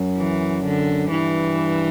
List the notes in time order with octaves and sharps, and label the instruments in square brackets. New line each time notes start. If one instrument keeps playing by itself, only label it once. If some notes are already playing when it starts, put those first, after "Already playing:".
Already playing: [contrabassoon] F#2
[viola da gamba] E3
D3
[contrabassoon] G2 [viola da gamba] E3